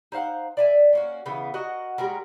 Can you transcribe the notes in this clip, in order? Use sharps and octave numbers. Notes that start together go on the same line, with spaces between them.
D#4 C5 F5 F#5
D5 E5 G#5
A#3 C#4 F#4
C#3 E3 B3
F#4 A#4 D#5 F#5
G3 G#3 F#4 A#4